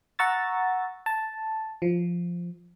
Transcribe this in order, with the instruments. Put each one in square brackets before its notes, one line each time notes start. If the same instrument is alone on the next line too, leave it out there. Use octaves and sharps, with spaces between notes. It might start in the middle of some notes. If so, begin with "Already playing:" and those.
[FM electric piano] F#5 A#5 C#6 E6 A6
A5
F3